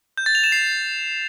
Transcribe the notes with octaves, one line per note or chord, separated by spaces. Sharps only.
G6
A6
F7
E7
C7